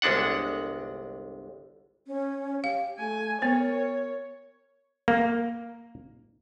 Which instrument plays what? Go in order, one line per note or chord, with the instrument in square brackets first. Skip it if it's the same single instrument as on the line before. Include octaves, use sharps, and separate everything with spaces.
[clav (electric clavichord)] G1 C2 G#3 D4 F#5
[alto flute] C#4
[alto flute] G4 [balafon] F5
[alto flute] A3 [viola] G#5
[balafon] B3 C5 [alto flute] A#4 [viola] C#5
[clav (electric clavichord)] A#3